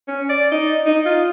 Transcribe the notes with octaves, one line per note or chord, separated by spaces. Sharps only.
C#4
D5
D#4
D#4
F4